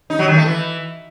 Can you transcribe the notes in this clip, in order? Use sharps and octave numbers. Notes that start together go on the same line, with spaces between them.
D#4
F#3
D#3
A3
E3